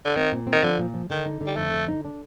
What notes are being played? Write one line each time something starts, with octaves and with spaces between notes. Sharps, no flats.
D3
D#3 C4
A#2
C4
D#3
D3 F3
A#2
F3
D3 D#3
D#4
D3
G3
F2 A3
D3
D#4
D4